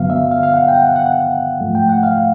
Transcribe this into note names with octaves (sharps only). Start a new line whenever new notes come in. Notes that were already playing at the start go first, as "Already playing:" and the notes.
Already playing: G2 D3 F#3 B3 F5
E5
F5
F5
F#5
G5
F#5
F#5
F#5
F#5
G#2 F3 A3
G5
F#5
F5